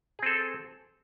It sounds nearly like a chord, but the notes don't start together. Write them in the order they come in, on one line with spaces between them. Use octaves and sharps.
G#4 C4 A4